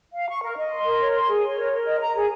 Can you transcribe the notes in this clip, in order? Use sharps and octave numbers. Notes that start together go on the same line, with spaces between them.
F5
C#6
A#4
D#5
C6
A#4
C#5
C6
G#4
C#5
A#4
A#4
D#5
A#5
G#4